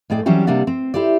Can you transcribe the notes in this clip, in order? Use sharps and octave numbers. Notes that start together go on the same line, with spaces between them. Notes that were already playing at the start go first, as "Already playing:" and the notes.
A2 G#3 D5 G5
E3 F#3 G3 C4 C#4 G4
C3 G3 A#3 D4 D5 F#5
C4
E4 G4 C5 D5